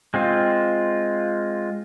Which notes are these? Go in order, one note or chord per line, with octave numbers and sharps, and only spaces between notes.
G#3 C4 F4